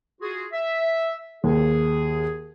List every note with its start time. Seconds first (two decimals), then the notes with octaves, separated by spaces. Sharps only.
0.21 F4 F#4 G#4
0.53 E5
1.44 D#2 G#4